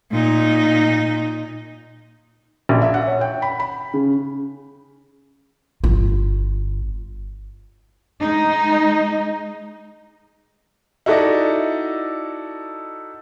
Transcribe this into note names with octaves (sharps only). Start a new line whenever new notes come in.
A#2 D#4
A#1
E5
F#5
C#5
G5
B5
B5
C#3
G1 F4
G#3 D#4
D#4 E4 F#4 A4 D5 D#5